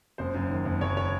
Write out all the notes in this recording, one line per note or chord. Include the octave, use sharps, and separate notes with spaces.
F#1 C5
F#2
D#3
F#1
F#1 C#5
C#5